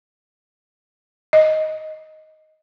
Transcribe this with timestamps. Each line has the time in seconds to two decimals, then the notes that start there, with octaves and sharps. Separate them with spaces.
1.33 D#5